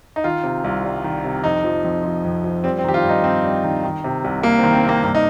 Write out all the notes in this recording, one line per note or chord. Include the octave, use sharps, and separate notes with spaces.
D#4
D#3 F4
C3
C2
G3
D#3
C3
F2 D#4
F3
F2
F3
F2
F3
G3 C4
C4
D#3 G4
F4
G2
D#4
G2 C4
G3
D#3
D#3
C3
C2
C2 A#3
C4
D#3
C4
C3
A#3
G2 A#3
D#4